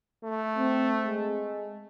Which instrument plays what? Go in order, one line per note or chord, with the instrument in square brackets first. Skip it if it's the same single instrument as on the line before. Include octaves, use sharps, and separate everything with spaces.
[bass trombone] A3
[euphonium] C4
G#3